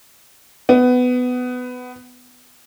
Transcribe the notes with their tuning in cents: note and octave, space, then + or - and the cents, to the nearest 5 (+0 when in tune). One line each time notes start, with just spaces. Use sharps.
B3 +15